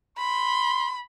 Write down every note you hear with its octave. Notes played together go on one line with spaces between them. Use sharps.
B5 C6